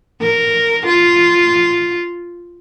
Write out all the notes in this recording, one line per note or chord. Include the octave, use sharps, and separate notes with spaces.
A#4
F4